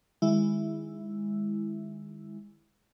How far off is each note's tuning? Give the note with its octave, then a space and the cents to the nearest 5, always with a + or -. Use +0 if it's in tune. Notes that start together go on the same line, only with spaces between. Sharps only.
D#3 -20 G#3 -15 E4 +0